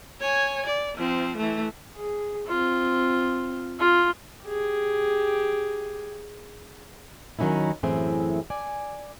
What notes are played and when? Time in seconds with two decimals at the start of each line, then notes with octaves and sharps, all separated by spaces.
0.21 C#5 G#5
0.66 D5
0.98 F3 C4
1.36 E3 A3
1.96 G#4
2.47 C4 F4
3.79 F4
4.44 G4 G#4
7.39 D#3 F#3 C#4 D#4 E4
7.83 F#2 A2 E3 C4 G#4 E5
8.50 D5 G#5